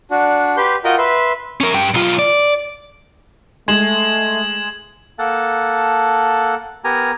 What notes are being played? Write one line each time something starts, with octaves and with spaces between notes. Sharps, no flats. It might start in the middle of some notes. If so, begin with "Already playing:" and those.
D4 F#4
G4 B4 C6 G6
F4 F#4 A#4 D#5 G5 A#5
B4 E5 C6
C#4 A#4
G2 G5
B1 F4
D5
G#3 A3 G#6 E7 F#7
A#3 A4 F#5 A5
B3 G4 A#4 G#5 A#5